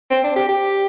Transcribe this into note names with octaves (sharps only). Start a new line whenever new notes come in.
C4
D4
G4
G4